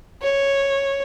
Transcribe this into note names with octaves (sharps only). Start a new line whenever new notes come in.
C#5